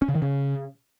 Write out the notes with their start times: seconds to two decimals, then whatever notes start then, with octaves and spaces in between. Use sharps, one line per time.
0.02 C#4
0.08 C#3
0.15 D#3
0.22 C#3